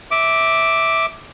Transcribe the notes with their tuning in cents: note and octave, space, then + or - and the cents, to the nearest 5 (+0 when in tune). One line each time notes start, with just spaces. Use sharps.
E5 -15 D6 +0